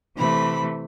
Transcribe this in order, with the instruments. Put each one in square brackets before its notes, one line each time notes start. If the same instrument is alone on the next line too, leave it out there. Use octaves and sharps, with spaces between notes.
[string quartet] C3 E3 A3 B5